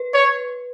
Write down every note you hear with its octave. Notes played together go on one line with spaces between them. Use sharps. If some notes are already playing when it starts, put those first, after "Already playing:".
Already playing: B4
C#5